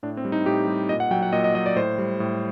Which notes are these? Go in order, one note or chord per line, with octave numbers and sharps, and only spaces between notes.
A2 D4
C4
G3
D#4
A2 G4
G3
A#2 D#5
F#5
F#3 G5
F#5
A#2 D#5
D#5
F#3 D#5
D5
A2 C5
G3
A2